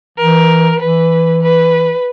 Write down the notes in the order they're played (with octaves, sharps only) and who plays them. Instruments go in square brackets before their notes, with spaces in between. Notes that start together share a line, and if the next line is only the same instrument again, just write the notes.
[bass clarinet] E3 [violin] A#4
[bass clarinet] E3 [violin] B4
[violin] B4